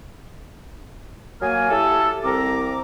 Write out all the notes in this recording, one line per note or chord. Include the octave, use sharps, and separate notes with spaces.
F#3 A#3 A#4 G#5
E4 G4 A4
C2 C4 A#5 D6